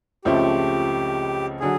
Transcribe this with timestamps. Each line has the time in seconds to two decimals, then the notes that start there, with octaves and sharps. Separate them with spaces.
0.25 C#2 C#3 F3 A3 C4 G4
1.60 D3 F#3 G#4